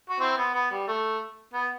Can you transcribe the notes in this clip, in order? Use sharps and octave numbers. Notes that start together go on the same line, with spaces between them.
F#4
C4 E4
B3
B3
G3
A3
B3